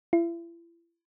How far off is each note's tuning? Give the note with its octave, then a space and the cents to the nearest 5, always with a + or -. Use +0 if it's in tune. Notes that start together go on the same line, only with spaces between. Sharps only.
E4 +40